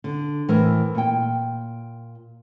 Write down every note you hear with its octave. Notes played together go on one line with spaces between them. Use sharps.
D3
A2 E3 A#4 C5
A#2 G5